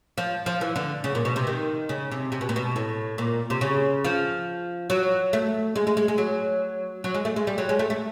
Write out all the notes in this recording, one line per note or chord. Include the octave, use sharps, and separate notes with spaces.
F3
F3
E3
D3
C#3
A#2
B2
C3
D#3
C#3
C3
C3
B2
A#2
B2
A2
A#2
C3
C#3
F3
F#3
A3
G#3
G#3
G#3
G#3
F#3
F#3
G#3
A3
G#3
G3
F#3
G#3
A3
A3